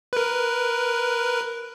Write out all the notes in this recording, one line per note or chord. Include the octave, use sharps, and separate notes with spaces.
A#4 B4